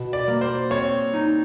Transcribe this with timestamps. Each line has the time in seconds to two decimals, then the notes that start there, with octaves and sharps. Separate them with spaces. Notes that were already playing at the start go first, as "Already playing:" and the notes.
Already playing: B2
0.13 D5
0.28 A#3
0.41 C5
0.70 C4 C#5
1.14 D#4